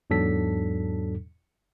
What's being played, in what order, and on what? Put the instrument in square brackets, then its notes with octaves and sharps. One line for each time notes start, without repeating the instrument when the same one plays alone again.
[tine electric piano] E2 G#2 F#3 D4 A4 B6